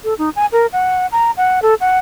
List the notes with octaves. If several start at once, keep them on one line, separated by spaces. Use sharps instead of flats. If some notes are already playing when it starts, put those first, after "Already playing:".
A4
D#4
G#5
A#4
F#5
A#5
F#5
A4
F#5